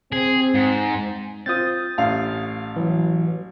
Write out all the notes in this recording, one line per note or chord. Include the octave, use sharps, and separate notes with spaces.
C4 G#4
G#2
C4 F4 D#6 G6 A6
A1 F5
E3 F#3